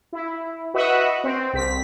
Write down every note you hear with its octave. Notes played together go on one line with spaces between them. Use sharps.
E4
F#4 B4 D#5 E5 F#5
C4
C2 B6